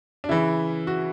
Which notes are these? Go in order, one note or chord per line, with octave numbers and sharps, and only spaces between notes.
D4
C#3 E3 E4
F#4